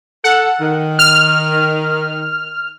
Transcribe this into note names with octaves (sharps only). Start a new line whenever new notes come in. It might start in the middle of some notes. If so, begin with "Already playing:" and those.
A4 F#5
D#3
F6